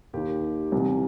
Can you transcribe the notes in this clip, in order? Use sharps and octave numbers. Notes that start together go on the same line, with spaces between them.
D#2 D#3 G4
C2 C3 E3